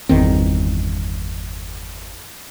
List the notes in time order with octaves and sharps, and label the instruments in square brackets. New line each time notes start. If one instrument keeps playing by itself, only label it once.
[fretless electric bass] G1 E2 D#3 C4